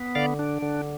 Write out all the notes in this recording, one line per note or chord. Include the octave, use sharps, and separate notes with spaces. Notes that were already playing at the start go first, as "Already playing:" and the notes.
Already playing: B3
D3 D5 F5
D4
D3